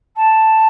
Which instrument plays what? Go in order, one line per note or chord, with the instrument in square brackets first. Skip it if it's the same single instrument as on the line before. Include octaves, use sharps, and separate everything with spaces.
[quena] A5